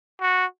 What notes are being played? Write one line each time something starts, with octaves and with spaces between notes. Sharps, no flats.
F#4